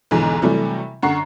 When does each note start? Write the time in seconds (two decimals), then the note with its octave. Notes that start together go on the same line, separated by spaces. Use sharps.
0.11 B1 E2 G#2 D3 E3
0.42 C3 E3 F#3 G3 A3
1.03 F#2 D3 F#5 C#6 C7